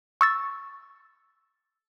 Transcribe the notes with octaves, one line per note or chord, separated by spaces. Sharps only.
C#6 E6 A6